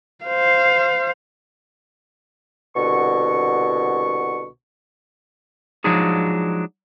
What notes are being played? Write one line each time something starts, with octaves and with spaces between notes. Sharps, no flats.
C5 F5
C2 B2 D3 C#6
F3 F#3 G#3 D4 D#4 G#4